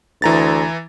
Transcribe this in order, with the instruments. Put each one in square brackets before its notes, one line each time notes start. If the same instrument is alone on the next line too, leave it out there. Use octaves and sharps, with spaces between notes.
[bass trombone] D2 [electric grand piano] E3 A#5 A6